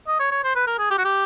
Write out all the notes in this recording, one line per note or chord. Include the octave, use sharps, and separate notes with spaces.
D#5
C#5
C#5
C5
B4
A#4
G#4
G4
F#4
G4